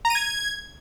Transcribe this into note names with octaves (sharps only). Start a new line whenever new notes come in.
A#5
D#7
G#6